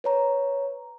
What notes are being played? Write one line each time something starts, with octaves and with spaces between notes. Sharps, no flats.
B4 C#5 A#5